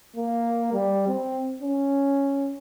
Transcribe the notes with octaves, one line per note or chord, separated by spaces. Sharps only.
A#3
G3
C4
C#4